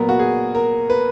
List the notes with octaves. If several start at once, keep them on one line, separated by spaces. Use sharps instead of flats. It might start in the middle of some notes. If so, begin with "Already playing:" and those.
Already playing: A#2 F#3 B3 A#4
F#4
G#4
A#4
B4